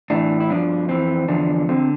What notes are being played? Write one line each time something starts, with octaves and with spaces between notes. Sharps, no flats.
A2 E3 D4
E4
G2 F3 D4
F2 E3 C4
E2 D3 F3 D4
D3 F3 C4